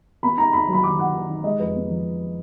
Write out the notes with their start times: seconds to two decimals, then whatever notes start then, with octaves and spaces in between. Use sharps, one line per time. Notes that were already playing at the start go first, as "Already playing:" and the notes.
0.23 B3 B5
0.37 D#4 A#5
0.53 D#4 B5
0.68 F#3 B5
0.84 D#3 D6
0.98 D#3 F#5
1.14 D#3
1.29 D#4
1.44 G#3 D#5
1.59 F2 B4
1.75 B3
1.89 F3